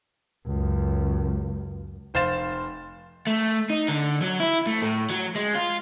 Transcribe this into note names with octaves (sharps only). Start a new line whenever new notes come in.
C#2 F#2
F1 C5 F5 A6 E7
A3
D#4
D3
F#3
E4
A3
A2
F#3
G#3
F4